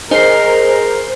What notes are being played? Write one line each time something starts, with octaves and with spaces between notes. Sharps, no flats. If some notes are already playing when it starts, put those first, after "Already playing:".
D#4 G#4 A#4 C5 G#5 F6 C7